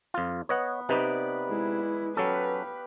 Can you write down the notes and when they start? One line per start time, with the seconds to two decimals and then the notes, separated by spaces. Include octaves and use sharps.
0.14 F2 F4
0.49 B3 C#5 D#5 F#5
0.89 C3 D#4 B4 D5
1.48 G#3 E4
2.17 F#3 C#4 G4 A4 B4 F5